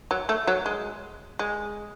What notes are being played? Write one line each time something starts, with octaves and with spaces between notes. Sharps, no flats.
F#3
A3
F#3
G#3
G#3